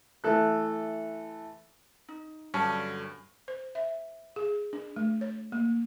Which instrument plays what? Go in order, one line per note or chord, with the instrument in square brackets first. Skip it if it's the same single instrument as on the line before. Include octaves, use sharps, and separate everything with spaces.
[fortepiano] E3 A3 A4 F#6
[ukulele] D#4
[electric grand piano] G2 [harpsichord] D3 F#3 [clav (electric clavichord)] C#4 [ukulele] A5
[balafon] C5
E5
G#4
D4
A3
C#5
A#3